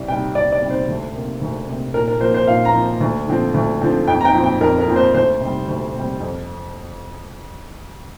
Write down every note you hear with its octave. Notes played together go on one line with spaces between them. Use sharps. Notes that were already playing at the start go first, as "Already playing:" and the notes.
Already playing: C2
C3 G3 G5
C2 D5
D5
C3 G3
C5
D2
C3 A#3
D2
C3 A#3
A#2 A#4
A#4
F3 A#3 C5
C5
A#2 F5
A#5
F3 A#3
D2
D3 F3 C4
D2
D3 F3 C4
F2 G5
A#5
G5
F3 C4
G5
F2 A#4
A#4
F3 C4
C5
D2 C5
C3 G3
D2
C3 G3
F2